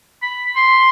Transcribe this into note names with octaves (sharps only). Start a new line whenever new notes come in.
B5
C6